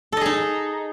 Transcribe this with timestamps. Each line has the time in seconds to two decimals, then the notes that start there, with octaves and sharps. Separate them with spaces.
0.12 A4
0.17 D#5
0.21 G#4
0.26 D#4